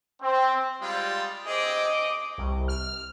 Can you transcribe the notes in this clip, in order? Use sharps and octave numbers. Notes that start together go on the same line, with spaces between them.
C4
G3 G#3 F4
C4 G#4 D#5 D6
C2
F6